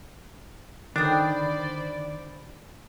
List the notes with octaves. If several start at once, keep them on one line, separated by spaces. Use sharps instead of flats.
D3 D#3 D4 C5 D5 G5 B5 D#6